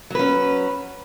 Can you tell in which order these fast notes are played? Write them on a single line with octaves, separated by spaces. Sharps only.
F#3 B4 C#4